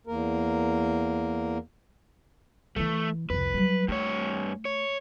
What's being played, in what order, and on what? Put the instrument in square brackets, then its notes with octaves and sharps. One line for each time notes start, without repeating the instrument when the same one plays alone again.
[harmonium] E2 A#3 A#4
[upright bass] E3 E4 [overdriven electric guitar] A3
[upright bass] C2 F2 [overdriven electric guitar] B4
[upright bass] F#3 G3
[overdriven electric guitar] G2 C#5 [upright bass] A3
[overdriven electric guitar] C#5